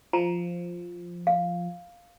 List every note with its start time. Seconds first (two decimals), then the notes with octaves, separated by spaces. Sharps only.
0.13 F3 A#5
1.27 F5